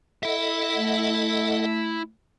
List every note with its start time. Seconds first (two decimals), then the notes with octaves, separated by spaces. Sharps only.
0.23 E4 A4 D#5 E5 F#5
0.74 A3